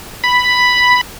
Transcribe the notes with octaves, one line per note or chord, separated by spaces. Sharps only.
B5